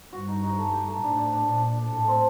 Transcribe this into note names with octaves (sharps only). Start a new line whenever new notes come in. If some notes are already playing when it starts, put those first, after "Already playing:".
G2 F#4
D#4
D#4
A3
G4
A3
A2 D4
D5
D4
A#2 D4
D4
D4
A2 A4
C4